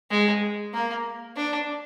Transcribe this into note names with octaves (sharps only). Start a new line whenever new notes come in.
G#3
A#3
D4